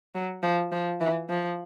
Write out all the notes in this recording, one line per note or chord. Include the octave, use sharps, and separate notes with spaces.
F#3
F3
F3
E3
F3